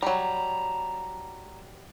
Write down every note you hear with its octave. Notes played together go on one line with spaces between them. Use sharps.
F#3 G3 A5 A#5